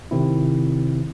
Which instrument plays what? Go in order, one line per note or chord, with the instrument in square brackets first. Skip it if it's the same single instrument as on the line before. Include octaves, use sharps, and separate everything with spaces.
[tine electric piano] C3 D#3 C4 E4